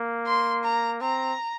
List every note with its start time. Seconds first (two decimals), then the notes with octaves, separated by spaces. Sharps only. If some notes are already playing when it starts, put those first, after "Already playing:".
Already playing: A#3
0.26 C6
0.64 A#5
1.01 C4 A#5